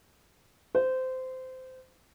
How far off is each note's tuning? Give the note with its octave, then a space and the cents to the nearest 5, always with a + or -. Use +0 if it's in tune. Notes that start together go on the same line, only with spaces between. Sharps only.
C5 -20